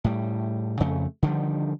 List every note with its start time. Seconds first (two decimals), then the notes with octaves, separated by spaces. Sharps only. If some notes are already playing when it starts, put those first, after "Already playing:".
0.04 A2 G3
0.80 F2 C#3 A3
1.23 D3 D#3 F3 G3